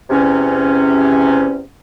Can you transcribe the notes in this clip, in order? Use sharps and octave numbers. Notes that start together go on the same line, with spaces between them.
E2 C3 C#4